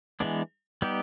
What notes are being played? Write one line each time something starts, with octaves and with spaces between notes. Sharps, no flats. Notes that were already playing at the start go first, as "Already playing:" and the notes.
E3 G#3 B3 D4
G3 B3 D#4 G4